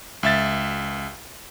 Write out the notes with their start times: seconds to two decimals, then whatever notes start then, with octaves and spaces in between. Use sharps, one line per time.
0.23 C#2 E5 A6